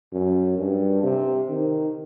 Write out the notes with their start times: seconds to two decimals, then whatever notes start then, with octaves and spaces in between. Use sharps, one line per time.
0.13 F#2
0.58 G2
1.03 C3
1.49 D#3